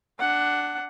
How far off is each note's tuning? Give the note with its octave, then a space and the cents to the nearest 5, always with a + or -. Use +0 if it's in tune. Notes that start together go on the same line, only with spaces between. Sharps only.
D4 +0 F#5 +10